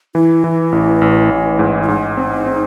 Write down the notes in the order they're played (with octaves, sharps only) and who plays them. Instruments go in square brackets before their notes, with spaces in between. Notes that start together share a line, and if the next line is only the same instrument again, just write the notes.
[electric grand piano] E3 [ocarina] E4
[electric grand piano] E3
A1
A1
A1
G#2
[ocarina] E4
[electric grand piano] G#2 [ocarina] D#4
[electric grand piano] C4
C4